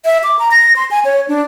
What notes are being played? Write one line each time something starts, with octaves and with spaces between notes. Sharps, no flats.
E5
D6
A#5
A#6
C6
G#5
C#5
D4